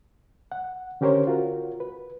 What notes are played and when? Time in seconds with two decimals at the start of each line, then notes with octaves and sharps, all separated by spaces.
0.52 F#5
1.01 D3 C#4 G4 A#4 C5 C#5
1.27 F4 F#4 A#4
1.80 B4